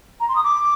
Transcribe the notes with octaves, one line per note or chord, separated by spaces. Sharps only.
A#5
C6
D#6
D6